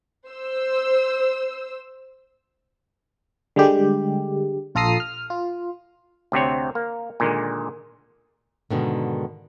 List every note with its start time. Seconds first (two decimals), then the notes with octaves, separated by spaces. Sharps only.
0.30 C5 E6
3.56 D3 G3 G#3 G4
4.75 A#1 F4 A4 A#5 D#6 C7
5.00 F6
5.30 F4
6.32 D2 C3 C4 C#5
6.75 A#3
7.20 A#2 D3 D#3 G#3
8.71 G#2 B2 D3 D#3